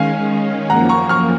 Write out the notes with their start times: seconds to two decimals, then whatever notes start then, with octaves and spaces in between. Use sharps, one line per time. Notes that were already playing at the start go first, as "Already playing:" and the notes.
Already playing: D#3 G#3 C#4 F5 G#5
0.70 F#2 F3 A#3 F#5 A#5
0.89 A#5 C#6
1.09 C#6 F6